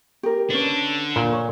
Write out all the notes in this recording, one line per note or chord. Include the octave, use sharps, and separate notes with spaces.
G4 A#4
D3 C#4 D4 B4
A#2
C#5